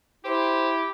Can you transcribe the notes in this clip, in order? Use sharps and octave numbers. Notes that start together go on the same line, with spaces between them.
E4 G4 C5